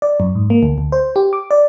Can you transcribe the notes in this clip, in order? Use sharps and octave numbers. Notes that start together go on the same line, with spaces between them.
D5
F#2
G#2
A#3
D2
D2
C5
G4
D6
D5